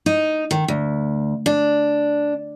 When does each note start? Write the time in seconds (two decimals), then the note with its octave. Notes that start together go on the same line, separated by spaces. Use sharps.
0.06 D#4
0.51 D#3
0.68 D2
1.46 D4